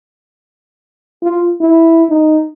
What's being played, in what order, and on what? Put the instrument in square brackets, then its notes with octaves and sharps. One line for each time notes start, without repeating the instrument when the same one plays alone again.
[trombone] F4
E4
D#4